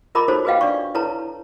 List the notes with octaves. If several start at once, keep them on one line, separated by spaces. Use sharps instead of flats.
F4 A#4 D#5 A#5 B5 D6
D#4 F#4 A4 C5 C#5
F#4 G#4 B4 D#5 F5 G5
D4 D5 C#6
E4 A4 B4 C#5 A5 A#5